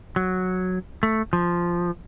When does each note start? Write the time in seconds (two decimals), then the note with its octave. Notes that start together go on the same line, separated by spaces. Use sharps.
0.16 F#3
1.03 A3
1.33 F3